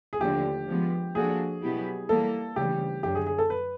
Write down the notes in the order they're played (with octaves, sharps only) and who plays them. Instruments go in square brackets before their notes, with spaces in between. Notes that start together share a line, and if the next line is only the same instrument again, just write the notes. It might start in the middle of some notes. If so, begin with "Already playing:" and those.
[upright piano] G#4
[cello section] D#2 D3 F3 A3 D4 [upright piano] G4
[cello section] F3 G#3 B3
[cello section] F3 A#3 D4 F#4 A4 [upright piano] G#4
[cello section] B2 F#3 B3 E4 G4
[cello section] E3 G3 A#3 [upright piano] A4
[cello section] D2 C#3 E3 G3 [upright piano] G4
[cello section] F#2 D3 F#3 [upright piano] G4
[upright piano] G#4
G#4
A4
B4